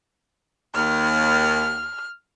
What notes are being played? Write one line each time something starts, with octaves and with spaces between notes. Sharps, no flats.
D#2 F6